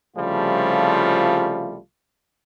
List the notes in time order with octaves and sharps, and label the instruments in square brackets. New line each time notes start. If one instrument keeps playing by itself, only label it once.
[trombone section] C2 C#3 F3 G3 A3 F4